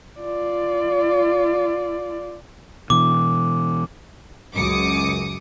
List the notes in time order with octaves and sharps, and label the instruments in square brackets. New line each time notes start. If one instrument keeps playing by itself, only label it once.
[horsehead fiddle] F4 D5
[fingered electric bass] B2 E3 [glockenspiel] D6
[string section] C#2 F#2 D6 D#6 C#7